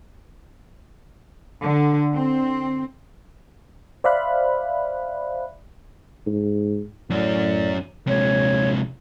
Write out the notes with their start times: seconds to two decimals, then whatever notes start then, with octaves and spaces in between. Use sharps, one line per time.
1.62 D3
2.13 C4
4.04 C5 D5 E5 F5 B5 F#6
6.26 G#2
7.10 F#2 A2 C#4 D5
8.07 A#1 C3 G#3 C#5